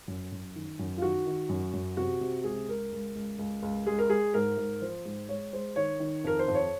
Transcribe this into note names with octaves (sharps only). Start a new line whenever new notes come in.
F#2
F#2
D#3
F#2
F4
D#3 F#4
D#3
F#2
F#2
C3 F#4
C3
C#2 G#4
C#2 A#4
C#2
C#2
C#2
C#2
G#3 G#4
A#4
G#3 G#4
G#2 A#4
G#2
F3 C5
G#2
G#3 C#5
G#3 C5
D#3 C#5
D#3
F2 A#4
C5
F2
C#5